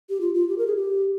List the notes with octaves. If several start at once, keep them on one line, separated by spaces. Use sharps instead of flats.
G4
F4
F4
G4
A#4
G#4
G4